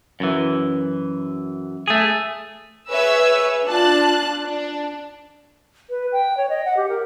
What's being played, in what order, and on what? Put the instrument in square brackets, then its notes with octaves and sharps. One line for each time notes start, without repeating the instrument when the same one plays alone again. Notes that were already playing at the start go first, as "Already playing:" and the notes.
[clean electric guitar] F#2 E3
A3 G#4
[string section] G#4 B4 C#5 E5 E6
D4 F4 A5 F#6
D4
[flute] B4
G5
C#5
D#5
F#5
G4
A#4